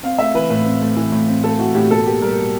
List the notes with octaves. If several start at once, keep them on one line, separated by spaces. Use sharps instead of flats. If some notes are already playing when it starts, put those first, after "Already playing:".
C4 F5
A3 E5
E3 B4
A2 B4
C4
A3
E3
A2
C4
A3 A4
E3 F#4
A2 G4
B2 A4
A#3 G4
G3 A#4
B2